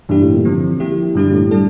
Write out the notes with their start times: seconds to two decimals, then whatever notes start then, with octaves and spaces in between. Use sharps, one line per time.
0.09 G2 E3 A#3 E4 G4
0.21 A2
0.33 A#2
0.45 D3 F3 C4
0.80 F3 A#3 E4 G4
1.15 G2 D3 G3 D4 G4
1.33 A2
1.51 G3 D4 A4